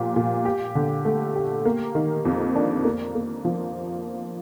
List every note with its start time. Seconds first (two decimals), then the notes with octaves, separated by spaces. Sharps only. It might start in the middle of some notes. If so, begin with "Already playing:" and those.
Already playing: A#2 F3 G4
0.16 A#2
0.45 G4
0.75 D3
1.05 A3
1.36 G4
1.65 A#3
1.95 D#3
2.25 F2
2.55 D4
2.84 A#3
3.15 A#3
3.45 F3